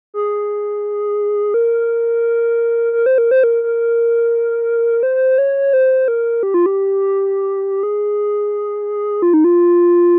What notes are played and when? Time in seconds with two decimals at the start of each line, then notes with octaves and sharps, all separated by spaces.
0.14 G#4
1.54 A#4
2.93 A#4
3.06 C5
3.18 A#4
3.31 C5
3.44 A#4
3.63 A#4
5.03 C5
5.38 C#5
5.73 C5
6.08 A#4
6.43 G4
6.54 F4
6.66 G4
7.83 G#4
9.22 F4
9.34 D#4
9.44 F4